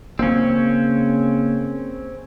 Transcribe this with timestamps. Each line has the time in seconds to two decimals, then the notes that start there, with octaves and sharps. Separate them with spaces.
0.19 C#3 A#3 C4 C#4